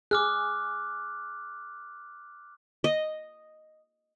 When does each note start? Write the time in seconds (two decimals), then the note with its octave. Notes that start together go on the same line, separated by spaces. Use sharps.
0.11 G#4 D6 F6 F#6
2.84 D#5